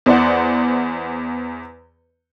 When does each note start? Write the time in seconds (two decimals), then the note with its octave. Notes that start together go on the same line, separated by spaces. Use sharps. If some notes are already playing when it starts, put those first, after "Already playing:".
0.06 E2 C5 D5 F#5